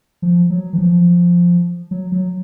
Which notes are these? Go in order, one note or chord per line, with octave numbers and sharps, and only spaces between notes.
F3
F#3
E3
F3
F#3
F#3